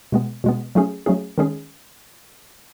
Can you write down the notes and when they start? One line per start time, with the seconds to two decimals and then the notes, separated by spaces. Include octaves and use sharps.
0.12 B2 G#3 B3
0.44 B2 G#3 B3
0.75 F#3 A3 C#4 G#4
1.06 F#3 A3 C#4 G#4
1.38 D#3 G#3 C#4 G#4